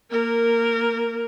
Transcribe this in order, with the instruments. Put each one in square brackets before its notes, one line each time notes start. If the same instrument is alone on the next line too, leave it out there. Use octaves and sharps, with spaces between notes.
[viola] A#3 A#4